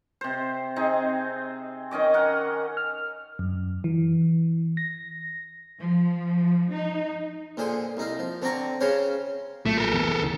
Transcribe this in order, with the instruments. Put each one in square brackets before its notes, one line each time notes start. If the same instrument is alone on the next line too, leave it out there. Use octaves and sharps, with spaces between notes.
[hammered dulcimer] C3 C5
C4 D#4 G#4
D#3 C#4 D#5 D6
A#4 F#5
[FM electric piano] F6
F#2
E3
A#6
[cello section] F3
D#4
[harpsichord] A#2 D3 G#4 C5
C2 D#4 F5
F3
D3 C4 D5 A#5 C#6
C#3 C#4 F4 C5 C#5
[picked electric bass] B1 A#2 [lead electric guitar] A3
[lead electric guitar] A4 A#4
[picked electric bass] F1 E3 B3
D2 C#3 E3